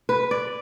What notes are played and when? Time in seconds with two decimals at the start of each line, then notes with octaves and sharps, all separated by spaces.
0.09 B4
0.31 D5